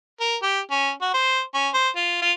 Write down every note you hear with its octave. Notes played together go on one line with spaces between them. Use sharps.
A#4
G4
C#4
F#4
C5
C#4
C5
F4
F4